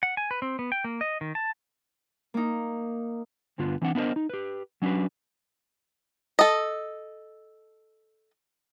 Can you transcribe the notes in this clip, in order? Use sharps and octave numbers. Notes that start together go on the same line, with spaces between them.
F#5
G#5
B4
C4
B3
G5
A#3
D#5
D#3
A5
A#3 D#4
D2 G2 D3 B3 F4
E3 C4 D4 F#5
B3 D4 E4 A#4 C5 D#5
D#4
G4 B4
F#3 C#4 D4 F#4 B4
A4 D#5